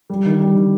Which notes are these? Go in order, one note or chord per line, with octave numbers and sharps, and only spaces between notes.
G3
D#3
G3
D#3